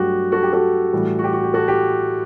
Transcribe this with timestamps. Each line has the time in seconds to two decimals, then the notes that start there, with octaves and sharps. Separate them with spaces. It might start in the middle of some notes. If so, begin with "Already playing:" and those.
Already playing: G2 F#3 A3 F#4 G4
0.32 F#4 A4
0.43 G4
0.53 F#4 A4
0.93 A2 E3 G3
1.19 F#4
1.24 G4
1.33 F#4
1.44 G4
1.54 F#4 A4
1.68 G4